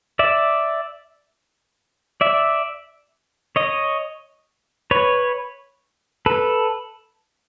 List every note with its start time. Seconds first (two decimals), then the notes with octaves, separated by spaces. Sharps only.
0.19 D5 E5
2.21 D5 E5
3.56 C#5 D#5
4.91 B4 C#5
6.26 A4 B4